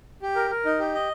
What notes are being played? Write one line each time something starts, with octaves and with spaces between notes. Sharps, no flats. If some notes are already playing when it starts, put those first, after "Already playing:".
G4
A#4
A#4
D#4
G4
D#5